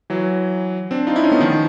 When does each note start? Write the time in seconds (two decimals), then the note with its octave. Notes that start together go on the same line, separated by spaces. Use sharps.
0.10 E3 F#3
0.91 C4 D4
1.07 D#4 F4
1.16 D4 E4
1.24 C#4 D#4
1.31 A3 B3
1.40 D#3 F3